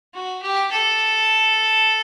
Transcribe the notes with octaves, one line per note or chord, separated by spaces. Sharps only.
F#4
G4
A4